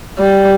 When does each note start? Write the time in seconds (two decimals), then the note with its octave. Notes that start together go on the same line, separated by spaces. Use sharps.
0.19 G3